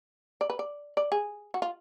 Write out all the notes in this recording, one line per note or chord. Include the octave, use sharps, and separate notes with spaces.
D5
B4
D5
D5
G#4
F#4
F4